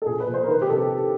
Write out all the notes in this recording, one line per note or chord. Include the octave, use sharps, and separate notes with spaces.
A4
A#2 G#4
B4
A#2
C5
A#4
D#3 B4
G4
C3 A4